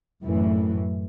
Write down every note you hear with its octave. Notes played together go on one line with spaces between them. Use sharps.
F#2 A2 E3